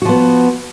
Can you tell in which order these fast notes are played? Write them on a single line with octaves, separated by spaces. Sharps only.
F#4 F3 B3